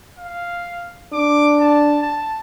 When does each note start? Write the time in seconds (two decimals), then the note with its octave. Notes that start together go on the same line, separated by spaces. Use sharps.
0.19 F5
1.13 D4 D6
1.60 A5
2.01 A5